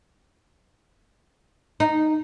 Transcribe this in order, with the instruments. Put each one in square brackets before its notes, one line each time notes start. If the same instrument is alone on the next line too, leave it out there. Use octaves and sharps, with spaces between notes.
[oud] D#4